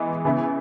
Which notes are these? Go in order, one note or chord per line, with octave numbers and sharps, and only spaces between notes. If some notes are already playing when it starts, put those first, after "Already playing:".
Already playing: E3 G#3 B3
C#3 E3 B3 E4